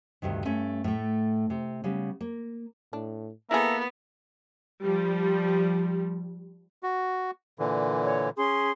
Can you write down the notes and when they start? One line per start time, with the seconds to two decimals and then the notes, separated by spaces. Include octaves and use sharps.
0.22 D2 G2 C3 D#3
0.45 G2 A3 C#4
0.84 A2 A3
1.50 C3
1.84 C#3 G3 B3
2.21 A#3
2.93 A2 D4
3.51 A#3 B3 E4 G#4 A4 E5 A#5
4.83 F3 G3
6.83 F#4
7.59 A#2 D3 E3
8.03 C#5
8.37 C#4 G#4 C6